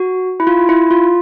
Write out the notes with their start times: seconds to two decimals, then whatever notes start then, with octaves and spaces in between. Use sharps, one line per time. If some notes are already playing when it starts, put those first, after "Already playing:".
Already playing: F#4
0.40 E4
0.47 F4
0.69 E4
0.91 F4